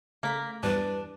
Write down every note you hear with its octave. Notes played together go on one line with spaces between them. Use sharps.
C#3 A3 A#3 B6
E2 G2 G3 D4 B4